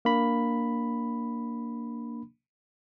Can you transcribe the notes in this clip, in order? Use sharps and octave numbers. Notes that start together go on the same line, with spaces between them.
A#3 D4 B5